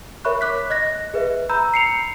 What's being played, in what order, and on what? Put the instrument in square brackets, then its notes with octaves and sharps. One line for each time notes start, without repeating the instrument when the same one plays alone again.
[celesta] A#4 C#5 E5 B5 C#6 F#6
D6 F#6 B6
D#5 F#6 A#6
G#4 B4 E5
A#5 B5 E6 G6
A#5 C7 C#7 F7